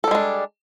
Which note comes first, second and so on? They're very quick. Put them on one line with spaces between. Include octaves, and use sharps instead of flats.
A4 G3 G#3 D4